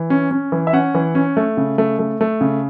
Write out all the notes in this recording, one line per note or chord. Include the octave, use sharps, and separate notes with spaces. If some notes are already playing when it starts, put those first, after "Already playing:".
Already playing: E3
C#4
C#4
E3
E5
C#4 F#5
E3
C#4
A3
C#3
A3
A3
A3
C#3